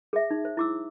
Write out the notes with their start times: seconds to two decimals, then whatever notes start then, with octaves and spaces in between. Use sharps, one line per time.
0.13 G#4 E5
0.31 D#4
0.45 C5
0.57 E4 D6 E6